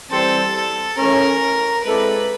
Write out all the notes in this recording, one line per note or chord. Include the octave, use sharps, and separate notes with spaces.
E3 G3 C4 A4
A4
E3 A3 C#4 A#4
G#3 C4 E4 A4 B4 D5